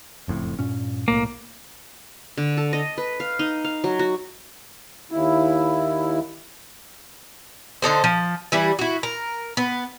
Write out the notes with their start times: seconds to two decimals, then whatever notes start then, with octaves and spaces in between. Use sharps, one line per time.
0.28 F#1 F2 A2
0.59 G2 A#2 C#4
1.08 B1 A2 A#3
2.37 D3
2.57 A4
2.73 D#5
2.98 B4
3.20 F5
3.39 D#4
3.65 F5
3.84 F#3
3.99 F#4
5.11 D#2 E4
7.82 D3 D#4 A4 C5
8.04 F3
8.52 E3 G3 E4
8.79 E4 F#4
9.03 A#4
9.57 B3